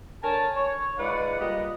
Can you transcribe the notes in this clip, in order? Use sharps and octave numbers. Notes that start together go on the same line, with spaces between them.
D3 A#4 C#5 G#5 A5
C#5
G#3 D#4 F4 B4 D5 F#5
A#2 G3 B4 D#5